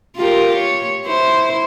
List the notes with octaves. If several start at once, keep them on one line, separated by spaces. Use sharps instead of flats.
F4 G4 A#4
C#5
E4 C5